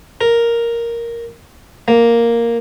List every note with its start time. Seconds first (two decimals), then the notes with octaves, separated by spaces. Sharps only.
0.21 A#4
1.88 A#3